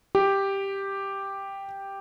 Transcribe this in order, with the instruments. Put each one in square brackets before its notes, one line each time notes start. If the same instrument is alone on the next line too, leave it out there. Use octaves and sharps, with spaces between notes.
[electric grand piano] G4 G5